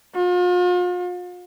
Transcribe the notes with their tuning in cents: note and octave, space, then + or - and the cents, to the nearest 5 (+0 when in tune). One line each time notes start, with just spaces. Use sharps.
F4 +40